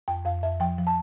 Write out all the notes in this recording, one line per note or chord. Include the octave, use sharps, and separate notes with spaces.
F2 G5
F2 F5
F2 E5
F3 G5
F3
A5